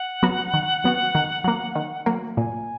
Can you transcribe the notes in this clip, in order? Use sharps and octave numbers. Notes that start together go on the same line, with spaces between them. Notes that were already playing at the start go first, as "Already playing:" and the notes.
Already playing: F#5
F#3 B3 F#4
D#3
F#3 B3 F#4
D#3
F#3 A#3
D#3
F#3 A#3
A#2 G#5